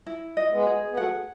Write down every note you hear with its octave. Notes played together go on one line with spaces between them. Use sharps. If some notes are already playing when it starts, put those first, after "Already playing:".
E4
D#5
G#3 B3
G#4
B3
F#3 A3 F#5